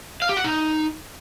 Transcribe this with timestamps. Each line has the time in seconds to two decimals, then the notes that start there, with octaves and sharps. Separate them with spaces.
0.22 F5
0.29 G4
0.37 F#5
0.44 D#4